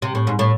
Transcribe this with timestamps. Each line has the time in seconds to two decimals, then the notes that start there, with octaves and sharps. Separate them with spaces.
0.02 C3
0.15 A2
0.27 G#2
0.39 A2